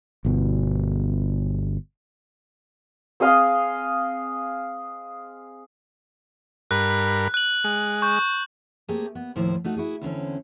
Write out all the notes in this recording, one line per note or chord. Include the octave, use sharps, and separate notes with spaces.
G1 B2
C4 G#4 D#5 F5
G2 A#4 B5 F#6
F#6 F#7
G#3
C#6 G6
A3 A#3 C4 G4 G#4
B3
D#2 A2 F3 E4 C5
A3 D#4 F#4
E4 F#4 G#4
E2 D3 C4 C#4